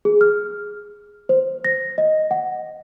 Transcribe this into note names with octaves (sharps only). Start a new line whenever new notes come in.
G#4
F6
C5
A#6
D#5
F#5